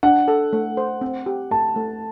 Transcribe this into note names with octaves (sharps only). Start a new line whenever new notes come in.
D4 F#5
A4
A3
C5
C4
G4
A3 A5
A3